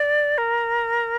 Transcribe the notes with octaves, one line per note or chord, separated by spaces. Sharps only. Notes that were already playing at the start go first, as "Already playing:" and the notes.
Already playing: D5
A#4